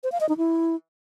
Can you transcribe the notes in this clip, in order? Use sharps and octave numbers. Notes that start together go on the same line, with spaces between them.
C5
F5
D#5
D#4
E4